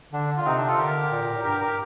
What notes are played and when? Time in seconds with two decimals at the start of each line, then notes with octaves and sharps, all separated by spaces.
0.13 D3 D4
0.37 F4
0.41 D3
0.45 C3 C4 D#4
0.56 D4
0.68 F4 A4
0.78 D3 G4 A#4
1.12 A#2
1.22 A#2
1.34 A2
1.44 G2 G4 A#4
1.61 G4 A#4